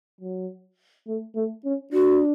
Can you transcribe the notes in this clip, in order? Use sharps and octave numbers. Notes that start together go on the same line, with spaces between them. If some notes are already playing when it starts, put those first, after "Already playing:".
F#3
A3
A3
C#4
D4 F#4